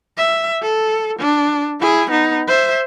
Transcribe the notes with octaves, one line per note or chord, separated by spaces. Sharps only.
E5
A4
D4
E4 G#4
B3 D#4
C5 E5